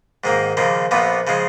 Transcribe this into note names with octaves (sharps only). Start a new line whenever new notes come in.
G#2 D#3 A#3
D#2 C#3 F3 A#3
A#1 A#2 F3 B3
C#3 F3 G#3